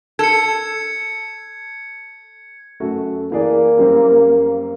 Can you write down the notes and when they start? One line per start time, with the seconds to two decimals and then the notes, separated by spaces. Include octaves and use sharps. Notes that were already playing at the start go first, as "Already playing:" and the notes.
0.19 A4 G#6 C#7
2.80 F#2 A3 F#4
3.32 E3 A#3 G#4 D5
3.77 F#2 G3 C4